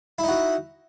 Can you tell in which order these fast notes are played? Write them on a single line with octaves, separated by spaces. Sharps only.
E4 D#4 F#4